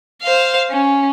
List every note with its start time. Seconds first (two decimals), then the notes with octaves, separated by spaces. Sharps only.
0.22 C5 F5
0.70 C#4